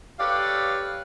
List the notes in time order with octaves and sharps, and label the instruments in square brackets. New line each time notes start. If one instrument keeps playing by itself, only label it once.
[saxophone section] G4 A4 B4 C#5 D5 F5